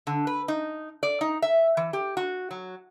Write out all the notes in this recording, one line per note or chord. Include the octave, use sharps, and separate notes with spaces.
D3
B4
D#4
D5
D#4
E5
E3
G4
F#4
F#3